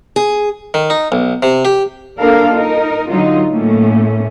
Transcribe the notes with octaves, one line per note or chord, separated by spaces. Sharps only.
G#4
D#3
D#4
B1
C3
G4
A#3 D4 F4 A4 A#4 F5
D#4 A#4
D3 F#3 D#4 F4
A2 A3 A#3 C#4